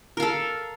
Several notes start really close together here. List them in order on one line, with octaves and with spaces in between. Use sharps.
A#4 F5 A4